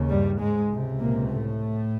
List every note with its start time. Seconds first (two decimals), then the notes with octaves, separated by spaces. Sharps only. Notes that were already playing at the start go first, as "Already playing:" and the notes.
Already playing: D#2 C#3
0.09 G2 G3
0.39 G#2 G#3
0.69 C#2 C3
0.99 A#2 A#3
1.29 A2 A3